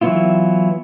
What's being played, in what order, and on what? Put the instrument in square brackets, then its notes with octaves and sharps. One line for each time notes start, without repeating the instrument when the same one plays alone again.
[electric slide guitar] E3 F#3 G#3 B3 E4 F4